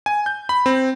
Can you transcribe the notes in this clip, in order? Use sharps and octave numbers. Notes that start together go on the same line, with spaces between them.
G#5
G6
B5
C4